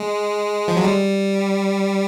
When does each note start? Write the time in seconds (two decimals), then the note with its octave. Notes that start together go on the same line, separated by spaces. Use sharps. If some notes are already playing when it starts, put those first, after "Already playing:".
Already playing: G#3
0.68 F3
0.77 F#3
0.84 G3